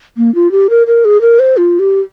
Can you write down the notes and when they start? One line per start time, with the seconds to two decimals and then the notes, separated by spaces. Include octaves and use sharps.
0.17 A#3
0.35 F4
0.52 G4
0.70 A#4
0.87 A#4
1.05 G#4
1.21 A#4
1.39 C5
1.57 F4
1.79 G4